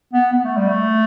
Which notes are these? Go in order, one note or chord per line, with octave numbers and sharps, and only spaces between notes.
B3
B3
A3
G3
A3